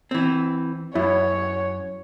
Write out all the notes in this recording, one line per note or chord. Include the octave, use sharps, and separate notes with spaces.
E3 C4
F#2 E4 C#5